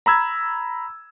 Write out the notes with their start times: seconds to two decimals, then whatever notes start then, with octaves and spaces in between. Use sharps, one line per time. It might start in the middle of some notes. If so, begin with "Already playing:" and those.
0.06 A#5 B5 E6 G#6